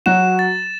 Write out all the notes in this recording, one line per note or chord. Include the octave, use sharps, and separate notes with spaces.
F#3 F#4 E7
A6